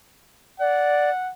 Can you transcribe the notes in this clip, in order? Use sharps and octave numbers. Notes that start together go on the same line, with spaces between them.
D5 F#5